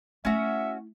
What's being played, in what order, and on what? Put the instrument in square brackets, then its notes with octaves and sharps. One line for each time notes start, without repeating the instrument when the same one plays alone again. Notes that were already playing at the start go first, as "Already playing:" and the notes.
[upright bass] A3 E4 [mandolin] C#4 F#4 [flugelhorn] E5